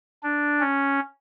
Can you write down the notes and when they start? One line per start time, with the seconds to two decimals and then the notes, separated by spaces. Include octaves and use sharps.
0.23 D4
0.61 C#4